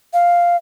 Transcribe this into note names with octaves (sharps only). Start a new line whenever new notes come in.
F5